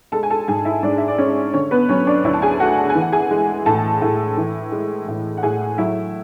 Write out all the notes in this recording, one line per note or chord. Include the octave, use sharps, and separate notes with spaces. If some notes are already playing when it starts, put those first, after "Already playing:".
G#3 A4 A5
G#5
A4 A5
G#2 G#4 G#5
E4 E5
G#2 D4 D5
E5
D5
G#3 C#4 C#5
D3 C#4 C#5
B3 B4
F#3 C#4 C#5
D4 D5
D2 E4 E5
A5
G#4 G#5
A3 F#4 F#5
A5
G#5
E3
F#5
G#4 G#5
G#3
A2 A4 A5
A2
E3
G#3
A2
F#5
A2 G#4 G#5
F#3 E4 E5